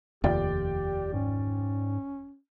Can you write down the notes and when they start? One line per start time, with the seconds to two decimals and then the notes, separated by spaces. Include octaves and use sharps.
0.24 F1 D#2 F4 G4 D5 G5
1.14 G#2 C#4